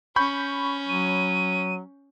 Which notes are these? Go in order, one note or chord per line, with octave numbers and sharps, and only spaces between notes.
C#4 B5 C#6 G6
F#3 D#7